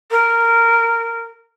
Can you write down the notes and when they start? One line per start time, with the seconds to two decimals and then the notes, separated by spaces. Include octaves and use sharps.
0.11 A#4